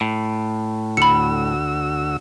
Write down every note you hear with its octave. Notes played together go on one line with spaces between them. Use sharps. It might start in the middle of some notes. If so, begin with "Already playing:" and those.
A2
D2 F#4 B5 E6 C#7